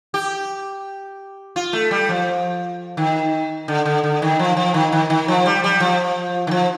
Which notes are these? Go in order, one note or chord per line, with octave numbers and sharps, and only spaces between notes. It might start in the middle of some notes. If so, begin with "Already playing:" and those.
G4
F4
A3
G3
F3
D#3
D3
D3
D3
D#3
F3
F3
D#3
D#3
D#3
F3
G3
G3
F3
D#3
F3